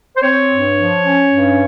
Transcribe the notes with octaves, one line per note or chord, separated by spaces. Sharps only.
C5
C4 C#5
G2
F3
C#4
G2